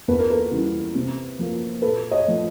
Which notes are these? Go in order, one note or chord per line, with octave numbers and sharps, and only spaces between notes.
E2 B4
A#4
A4 B4
C#3 E3 G3
C3
F3 A#3
A#2 A4 B4
C#5 D#5
F3 A3